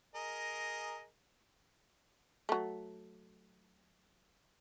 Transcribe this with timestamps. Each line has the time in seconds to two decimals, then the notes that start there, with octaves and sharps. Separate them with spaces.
0.15 G#4 A#4 D#5
2.49 F#3 A3